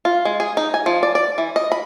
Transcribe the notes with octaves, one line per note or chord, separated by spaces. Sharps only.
F4
G#3
G#4
D#4
G#5
F3
D5
D5
E3
D#5
B5